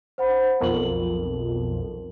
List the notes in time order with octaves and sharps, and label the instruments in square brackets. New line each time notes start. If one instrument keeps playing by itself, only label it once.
[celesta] C5 F#5 B5
[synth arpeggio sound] B1 F2 [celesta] A#4 F#7